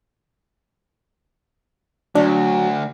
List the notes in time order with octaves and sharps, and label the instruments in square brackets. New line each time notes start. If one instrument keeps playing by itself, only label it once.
[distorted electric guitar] D2 [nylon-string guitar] F#3 [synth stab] D4